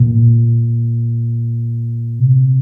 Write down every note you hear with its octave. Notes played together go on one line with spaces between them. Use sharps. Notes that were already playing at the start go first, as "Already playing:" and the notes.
Already playing: A#2
C3